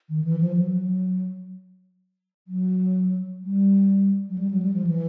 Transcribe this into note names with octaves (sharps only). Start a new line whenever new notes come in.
D#3
E3
F3
F#3
F#3
G3
F#3
G3
F#3
G3
F3
E3